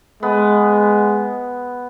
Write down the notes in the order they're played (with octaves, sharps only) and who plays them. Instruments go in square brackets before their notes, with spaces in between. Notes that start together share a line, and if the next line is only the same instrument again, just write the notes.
[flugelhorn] G#3 [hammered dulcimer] B3